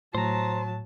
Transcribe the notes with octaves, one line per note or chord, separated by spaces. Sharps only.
A2 F#3 C5 A5 A#5